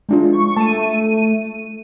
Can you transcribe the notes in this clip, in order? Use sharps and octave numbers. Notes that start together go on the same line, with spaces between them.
G#3 D4 F4
C#6
A3 A5 D#7